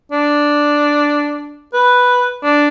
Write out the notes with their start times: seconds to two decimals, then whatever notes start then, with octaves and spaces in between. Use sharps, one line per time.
0.12 D4
1.74 B4
2.43 D4